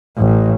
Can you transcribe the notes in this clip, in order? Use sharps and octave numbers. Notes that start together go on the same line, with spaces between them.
A1